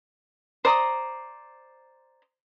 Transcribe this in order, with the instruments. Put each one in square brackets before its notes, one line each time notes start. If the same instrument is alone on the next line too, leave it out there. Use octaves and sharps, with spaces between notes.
[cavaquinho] C5 D5 A#5 D#6